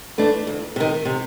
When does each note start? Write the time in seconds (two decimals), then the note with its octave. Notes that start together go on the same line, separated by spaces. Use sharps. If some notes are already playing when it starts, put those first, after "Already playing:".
0.18 E3 A3 D4
0.47 D2
0.76 C3 D#3
1.05 C3